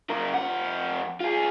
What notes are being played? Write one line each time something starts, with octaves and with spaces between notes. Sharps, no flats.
C#3 A#4
F2 F#5
F4 G#4